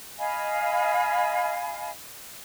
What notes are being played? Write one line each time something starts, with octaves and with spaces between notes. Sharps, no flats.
D#5 F5 G#5 B5